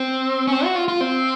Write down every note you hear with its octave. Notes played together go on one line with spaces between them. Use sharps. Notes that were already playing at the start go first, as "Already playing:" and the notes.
Already playing: C4
C#4
C4
F#4
F4
F4
C4